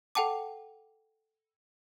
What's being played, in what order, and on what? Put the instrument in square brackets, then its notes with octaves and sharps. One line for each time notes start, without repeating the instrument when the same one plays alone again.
[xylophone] A4 F#5 G5 A5 D6